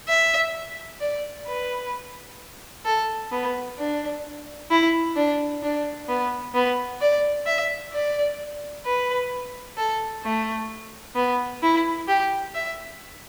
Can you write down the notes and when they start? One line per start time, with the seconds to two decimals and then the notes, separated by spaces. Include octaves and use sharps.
0.08 E5
1.01 D5
1.47 B4
2.85 A4
3.31 B3
3.78 D4
4.71 E4
5.16 D4
5.63 D4
6.09 B3
6.54 B3
7.01 D5
7.46 E5
7.93 D5
8.86 B4
9.77 A4
10.24 A3
11.16 B3
11.63 E4
12.08 G4
12.55 E5